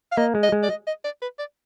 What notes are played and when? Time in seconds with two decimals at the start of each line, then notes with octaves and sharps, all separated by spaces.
0.12 F5
0.17 A#3 D#5
0.35 G#3
0.43 D#5
0.52 G#3
0.63 D5
0.70 D#5
0.87 D#5
1.04 D5
1.22 B4
1.39 D5